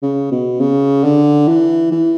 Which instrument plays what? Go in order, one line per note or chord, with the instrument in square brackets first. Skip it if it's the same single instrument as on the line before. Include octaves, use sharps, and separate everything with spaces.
[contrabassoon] C#3
B2
C#3
D3
E3
E3